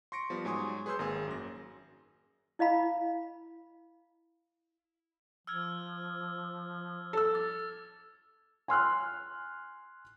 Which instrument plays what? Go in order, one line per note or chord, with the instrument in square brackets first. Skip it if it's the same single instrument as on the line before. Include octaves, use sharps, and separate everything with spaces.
[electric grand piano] C6 C#6 A#6 C#7 D7
F3 G3 B3
G#2 F#3 G#5 C6 C#6 D#6
G#4 B4 C#5 C6 E6 G6
G#1 A#3 G#4 G#5
F#2 A#6
[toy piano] E4 D#5 F5 B5
[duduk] F3 [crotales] E6 F6 G#6
[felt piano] A4 E6
[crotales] D6 A6
[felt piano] G#5 C6 F6 F#6